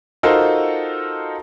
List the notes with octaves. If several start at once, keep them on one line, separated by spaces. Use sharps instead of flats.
D#4 F4 F#4 A4 A#4 C5